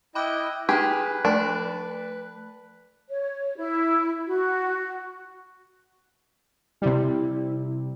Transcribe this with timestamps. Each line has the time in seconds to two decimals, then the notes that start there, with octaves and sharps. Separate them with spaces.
0.15 E4 D#5 G5 B5 D6 F#6
0.69 D#4 G4 G#4 B4 A#5 B6
1.25 F3 A3 D4 A5
3.09 C#5
3.57 E4
4.27 F#4
6.82 C3 G3 E4